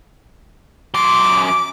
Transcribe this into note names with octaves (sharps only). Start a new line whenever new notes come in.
F#2 C6 D6